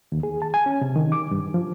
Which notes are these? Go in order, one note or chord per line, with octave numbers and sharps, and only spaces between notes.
D#2
G#4
A5
G#5
C#4
C3
D#3
D6
G2
F3